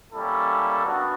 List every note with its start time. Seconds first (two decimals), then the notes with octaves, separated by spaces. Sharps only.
0.12 G3 A#3 C#4 E4 A4
0.85 B3 D4 F#4